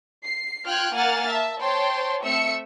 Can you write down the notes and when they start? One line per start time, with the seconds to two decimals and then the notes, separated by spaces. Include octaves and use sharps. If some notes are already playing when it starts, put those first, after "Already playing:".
0.24 C7
0.66 F4 G5 F6 F#6 G#6
0.94 A#3 F#5 G#5 F6 A6
1.29 E5 A5
1.61 C5 C#5 G5 A5 C6
2.24 A3 C4 E5 E6 C#7